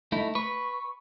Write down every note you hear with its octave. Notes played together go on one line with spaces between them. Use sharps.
A3 D#4 E4
B4 C#6